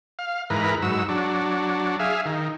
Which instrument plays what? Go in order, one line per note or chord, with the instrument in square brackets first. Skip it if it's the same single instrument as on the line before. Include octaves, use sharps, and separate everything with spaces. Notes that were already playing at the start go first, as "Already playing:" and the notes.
[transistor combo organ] F5
G#2 E3 A#4 B4
G#2 F#3 E6
F#3 D4
G#4 E5 F5
D#3